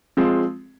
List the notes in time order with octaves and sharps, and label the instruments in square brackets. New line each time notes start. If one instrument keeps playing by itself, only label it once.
[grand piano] F3 G#3 C4